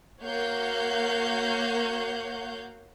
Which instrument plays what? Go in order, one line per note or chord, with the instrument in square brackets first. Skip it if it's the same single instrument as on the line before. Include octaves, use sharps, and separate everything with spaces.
[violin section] A#3 F#4 C#5 F5 F#5 G6